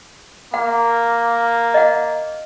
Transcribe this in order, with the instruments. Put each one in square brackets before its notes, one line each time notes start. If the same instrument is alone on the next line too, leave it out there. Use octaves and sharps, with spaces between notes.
[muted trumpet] A#3 [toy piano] F#5
[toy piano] D#5 F#5